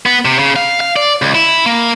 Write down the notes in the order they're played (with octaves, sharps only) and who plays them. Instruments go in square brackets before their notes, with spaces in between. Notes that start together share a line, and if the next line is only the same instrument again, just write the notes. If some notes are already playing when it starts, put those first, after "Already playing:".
[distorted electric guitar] B3
C3
C#3
F5
F5
D5
C#2
E4
A#3